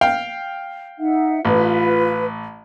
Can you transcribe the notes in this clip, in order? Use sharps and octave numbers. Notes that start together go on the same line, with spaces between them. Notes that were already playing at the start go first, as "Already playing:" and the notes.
F5 G5
D#4 E5 F#5
A1 F4 B4